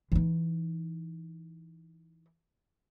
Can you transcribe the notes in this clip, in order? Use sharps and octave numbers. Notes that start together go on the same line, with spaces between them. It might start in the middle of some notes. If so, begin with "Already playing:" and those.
E3 D#4